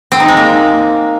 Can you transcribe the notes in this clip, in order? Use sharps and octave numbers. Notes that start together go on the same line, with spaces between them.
C4
D#4
G#3
A#3